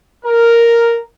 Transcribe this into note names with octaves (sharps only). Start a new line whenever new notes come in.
A#4